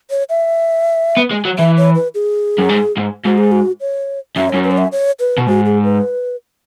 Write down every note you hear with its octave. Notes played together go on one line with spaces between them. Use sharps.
C#5
E5
B3
G#3
F#3
E3 E5
C#5
B4
G#4
F#2
G#2
G#2
G#2 F#4
G#4
F#4
C#5
F#2 E5
F#2 C#5
B4
C#5
E5
C#5
B4
B2
G#2 F#4
G#4
B4